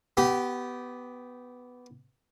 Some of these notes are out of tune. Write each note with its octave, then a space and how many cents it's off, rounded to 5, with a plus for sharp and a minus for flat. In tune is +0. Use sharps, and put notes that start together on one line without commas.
B3 +5 G4 -15